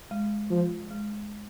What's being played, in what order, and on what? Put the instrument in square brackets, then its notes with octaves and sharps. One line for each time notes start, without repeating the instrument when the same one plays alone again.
[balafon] G#3
[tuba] F3
[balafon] G#3